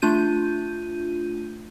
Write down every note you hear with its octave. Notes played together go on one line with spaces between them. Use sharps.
A3 D4 F4 G6 D#7